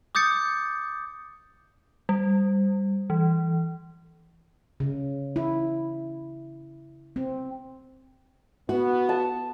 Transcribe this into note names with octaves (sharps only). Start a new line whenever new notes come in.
D6 D#6 G6 A6 C#7
G3
E3
C#3
E4
C4
B3 F#4
A5